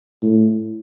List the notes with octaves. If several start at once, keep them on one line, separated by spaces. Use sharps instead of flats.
A2